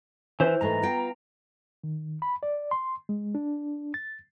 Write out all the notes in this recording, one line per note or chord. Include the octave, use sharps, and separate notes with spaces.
E3 C5
G#2 E3 A3 A#5
B3 F4 G5
D#3
B5
D5
C6
G#3
D4
A6